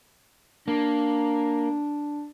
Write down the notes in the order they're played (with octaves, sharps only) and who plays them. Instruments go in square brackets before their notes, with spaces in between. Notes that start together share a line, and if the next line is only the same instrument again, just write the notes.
[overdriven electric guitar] A#3 [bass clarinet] D4